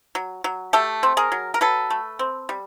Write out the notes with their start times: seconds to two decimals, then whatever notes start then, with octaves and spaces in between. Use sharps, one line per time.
0.15 F#3
0.44 F#3
0.73 A3 G4 A4
1.03 C4
1.17 G#4 A#4
1.32 F#3
1.54 A#4
1.61 F#3 A4 B4
1.90 A3
2.19 C4
2.49 G3